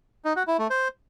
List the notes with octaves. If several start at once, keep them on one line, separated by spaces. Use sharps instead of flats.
D#4
F#4
E4
A3
C5